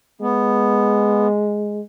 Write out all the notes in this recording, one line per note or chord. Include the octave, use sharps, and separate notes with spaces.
G#3 B3